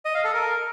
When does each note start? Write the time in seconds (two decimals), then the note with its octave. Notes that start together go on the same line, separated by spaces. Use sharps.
0.05 D#5
0.15 F5
0.24 A4
0.34 A#4